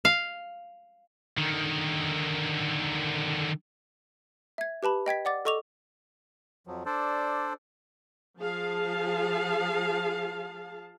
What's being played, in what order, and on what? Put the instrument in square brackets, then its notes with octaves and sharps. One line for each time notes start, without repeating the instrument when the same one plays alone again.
[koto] F5
[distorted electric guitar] D3 D#3
[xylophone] E5 G#6
G4 B4 A5 B5
D#5 G5 G#6 B6
D5 F#5 D6 A6
A4 D#5 C#6 D6 F7
[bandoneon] F2 F3 F#3
D4 A4 C5 D5
[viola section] F3 G#4 F5 A5